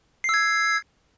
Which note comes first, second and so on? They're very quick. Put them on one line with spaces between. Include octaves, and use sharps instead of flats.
C7 E6 G#6